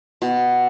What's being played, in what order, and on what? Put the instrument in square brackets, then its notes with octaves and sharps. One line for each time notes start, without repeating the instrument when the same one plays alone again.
[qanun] B2